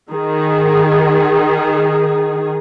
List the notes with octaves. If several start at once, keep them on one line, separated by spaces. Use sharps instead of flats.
D#3 G#4